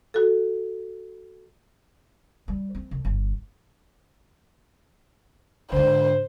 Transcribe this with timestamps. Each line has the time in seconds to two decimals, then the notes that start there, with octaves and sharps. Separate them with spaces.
0.14 F#4 A4
2.48 G3
2.75 C4
2.91 C2
3.05 G1
5.72 G#2 D3 C5